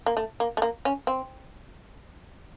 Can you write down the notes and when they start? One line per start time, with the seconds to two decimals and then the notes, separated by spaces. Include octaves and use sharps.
0.06 A#3
0.17 A3
0.40 A#3
0.57 A3
0.62 A#3
0.85 C#4
1.07 C4